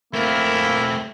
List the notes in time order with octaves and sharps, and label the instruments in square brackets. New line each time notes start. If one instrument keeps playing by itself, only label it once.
[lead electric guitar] A3 C4 [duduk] A#3 [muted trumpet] E4 [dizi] A#4